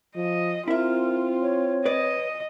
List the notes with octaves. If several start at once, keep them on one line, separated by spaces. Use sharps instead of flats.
F3 D#5
C4 E4 F4 A#4 E5
C#5
B4 D5 D#5